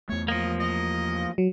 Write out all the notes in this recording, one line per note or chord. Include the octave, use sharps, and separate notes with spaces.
E2 A3 C#5
F3 A#3 D#5
D#5
F#3